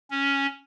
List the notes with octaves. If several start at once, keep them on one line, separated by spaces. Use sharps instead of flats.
C#4